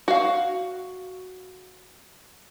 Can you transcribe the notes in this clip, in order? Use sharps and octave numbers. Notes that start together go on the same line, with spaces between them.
F#4 F5